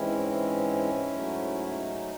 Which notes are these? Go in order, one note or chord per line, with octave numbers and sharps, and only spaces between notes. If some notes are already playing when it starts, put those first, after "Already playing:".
Already playing: G#2 E3 G#3 C4 C#4 E4
G#2 F#3 A3
E4
D#4